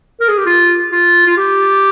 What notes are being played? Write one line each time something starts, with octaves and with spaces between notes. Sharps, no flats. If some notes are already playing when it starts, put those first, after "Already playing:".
A#4
G#4
G4
F4
F4
F4
G4